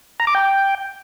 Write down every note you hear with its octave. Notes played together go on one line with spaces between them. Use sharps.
A#5
D6
G5